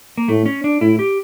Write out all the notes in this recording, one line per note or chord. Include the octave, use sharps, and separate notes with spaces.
A#3
A2 A3
C#4
D4
A2 E4
G4